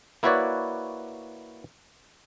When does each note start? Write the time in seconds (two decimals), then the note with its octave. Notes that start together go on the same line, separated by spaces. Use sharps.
0.23 A#3 E4 F#4 B4 C#5 D5